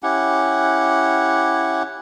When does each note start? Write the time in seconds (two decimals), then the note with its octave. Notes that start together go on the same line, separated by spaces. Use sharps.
0.03 C#4 E4 G4 F#5